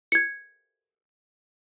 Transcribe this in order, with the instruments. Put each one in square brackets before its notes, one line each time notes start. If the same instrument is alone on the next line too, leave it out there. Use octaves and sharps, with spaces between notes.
[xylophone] G#6 C#7